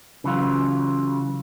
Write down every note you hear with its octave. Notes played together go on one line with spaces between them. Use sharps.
C#3 E3 F#3 F4